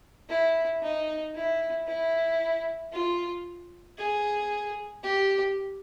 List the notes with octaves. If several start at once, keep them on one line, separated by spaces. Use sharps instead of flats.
E4
D#4
E4
E4
F4
G#4
G4